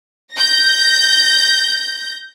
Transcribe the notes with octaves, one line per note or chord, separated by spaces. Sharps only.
G6 A#6